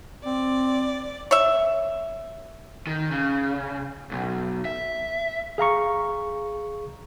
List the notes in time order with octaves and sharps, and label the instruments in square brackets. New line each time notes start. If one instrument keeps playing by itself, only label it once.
[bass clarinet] C4 [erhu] D5
[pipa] C#5 E5
[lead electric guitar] D#3
C#3
B1
E5
[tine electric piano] G#4 F5 A#5 C#6